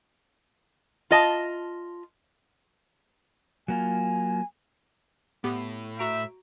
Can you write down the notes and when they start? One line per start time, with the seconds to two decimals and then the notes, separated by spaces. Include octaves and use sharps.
1.11 F4 D#5 A5
3.68 F#3 A#3 F4 G#5
5.44 A2 B3 G4
5.99 F#4 E5 A#5 D7